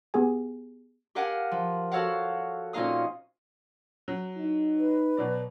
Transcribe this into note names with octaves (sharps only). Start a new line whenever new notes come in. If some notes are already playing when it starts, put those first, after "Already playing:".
B3 G4 G#4 G#5
G4 A#4 F5 F#5 G#5
F3
F#4 A4 C#5 F5 F#5
A#2 C4 C#4 D#4 F5 D#6
F#3
D#4
B4
B2 F#3 D5